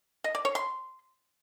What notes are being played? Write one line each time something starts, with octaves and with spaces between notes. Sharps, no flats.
D#5
D5
C#5
C6